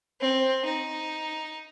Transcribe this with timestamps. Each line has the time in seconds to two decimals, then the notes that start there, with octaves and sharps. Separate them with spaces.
0.21 C4
0.65 D#4